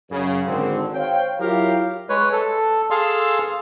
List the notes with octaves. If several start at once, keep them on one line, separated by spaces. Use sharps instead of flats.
F#2 C#3
G#1 D3 C4
C5 C#5 F5 G5
F#3 E4 F4 G4 A#4 F5
G#3 B4 C#5
A4
G#4 A4 F5 A5 C6 E6